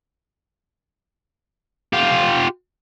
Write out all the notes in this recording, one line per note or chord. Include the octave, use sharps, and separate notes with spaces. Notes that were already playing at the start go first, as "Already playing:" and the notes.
F4 G4